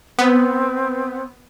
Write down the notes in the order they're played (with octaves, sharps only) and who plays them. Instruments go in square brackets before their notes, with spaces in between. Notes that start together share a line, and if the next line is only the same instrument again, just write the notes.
[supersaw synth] B3 [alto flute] C4